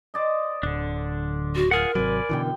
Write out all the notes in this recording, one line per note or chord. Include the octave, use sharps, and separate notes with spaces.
C5 D5 D#5
D1 D3 D4
F#4
F4 G#4 A#4 F#5
G#1 C3 F#3 D5 G#5 B5
F#2 B2 D3 E3 G5